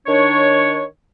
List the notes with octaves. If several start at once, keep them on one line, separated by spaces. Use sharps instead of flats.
D#3 D4 C#5